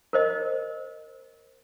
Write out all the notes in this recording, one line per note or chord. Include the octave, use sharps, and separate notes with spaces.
A#4 C5 D#5